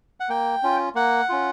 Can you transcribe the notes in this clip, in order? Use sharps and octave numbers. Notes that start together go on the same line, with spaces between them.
F#5
A#3 G5
C#4 F4
A#3 F#5
C#4 F4